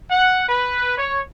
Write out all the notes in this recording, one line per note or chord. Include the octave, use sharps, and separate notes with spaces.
F#5
B4
C#5